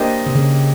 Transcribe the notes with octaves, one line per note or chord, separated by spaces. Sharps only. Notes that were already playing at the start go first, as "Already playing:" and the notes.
Already playing: A#3 D4 G4 C5 D#5
C3
C#3